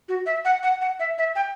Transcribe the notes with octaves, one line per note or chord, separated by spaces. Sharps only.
F#4
E5
F#5
F#5
F#5
E5
E5
G5